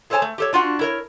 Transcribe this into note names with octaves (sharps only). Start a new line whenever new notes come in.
G#4 A4 C5 C#5 G#5 A5
A3
G4 A4 C#5
D4 F4 F#4 F#5
E4 A#4 C#5